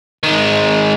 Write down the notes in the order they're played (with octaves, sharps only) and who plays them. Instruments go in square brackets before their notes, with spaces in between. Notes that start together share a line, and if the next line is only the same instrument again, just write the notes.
[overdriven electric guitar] D#3 G#3